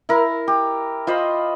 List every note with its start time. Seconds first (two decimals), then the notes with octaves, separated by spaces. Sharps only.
0.09 E4 A#4
0.48 G4
1.07 F4 C5 D#5 B5